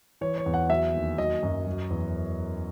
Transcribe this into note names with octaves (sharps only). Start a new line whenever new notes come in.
E3 C#5
C#5
E2
F#5
F#3 E5
D#2
F#3 D#5
F#2
F#3
E2